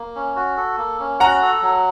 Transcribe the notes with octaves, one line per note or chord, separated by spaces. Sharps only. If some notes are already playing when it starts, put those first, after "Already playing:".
Already playing: A#3
C#4
F#4
A4
A#3
C#4
F#4 F#5 A#5
A4
F#3